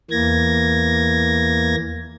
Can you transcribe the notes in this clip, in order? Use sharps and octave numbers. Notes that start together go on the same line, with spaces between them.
E2 E3 A#3 G#6 A#6